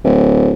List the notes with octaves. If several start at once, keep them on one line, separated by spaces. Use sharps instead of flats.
D1